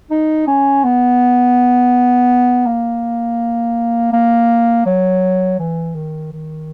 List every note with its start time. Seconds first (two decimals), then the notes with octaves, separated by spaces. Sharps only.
0.11 D#4
0.47 C#4
0.84 B3
2.66 A#3
4.13 A#3
4.86 F#3
5.59 E3
5.95 D#3
6.33 D#3